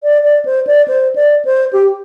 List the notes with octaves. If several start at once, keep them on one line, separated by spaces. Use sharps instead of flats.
D5
D5
C5
D5
C5
D5
C5
G4